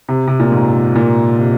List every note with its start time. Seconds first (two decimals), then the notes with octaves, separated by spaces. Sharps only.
0.09 C3
0.27 C3
0.40 A#2
0.52 G#2
0.96 A#2
1.39 C3